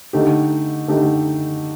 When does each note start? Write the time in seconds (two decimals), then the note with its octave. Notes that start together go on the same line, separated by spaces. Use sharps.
0.13 D3 A3 D#4 G4
0.88 D3 A3 D#4 G4